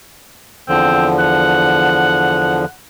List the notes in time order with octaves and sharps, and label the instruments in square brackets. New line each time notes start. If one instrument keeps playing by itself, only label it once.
[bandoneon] E2 D3 F3 [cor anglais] C4
[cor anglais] F#5